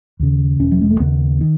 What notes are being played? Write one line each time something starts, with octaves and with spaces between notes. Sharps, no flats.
D#2 C#3
E1 C#4
F#3
G#3
A3
D#2 C#3 B3
D#3